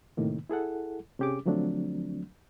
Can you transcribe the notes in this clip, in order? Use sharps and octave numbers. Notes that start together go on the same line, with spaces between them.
A2 C3 D#3 A#3
E4 G#4 A4 F#5
C3 C#4 G4 G#4 D6
D3 F3 F#3 A3 C4 D4